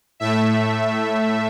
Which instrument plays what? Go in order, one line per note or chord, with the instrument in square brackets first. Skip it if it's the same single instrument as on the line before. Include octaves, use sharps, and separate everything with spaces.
[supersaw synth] A2 A3 E5